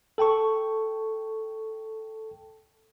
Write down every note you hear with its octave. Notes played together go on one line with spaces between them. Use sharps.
A4 G5 A5 C#6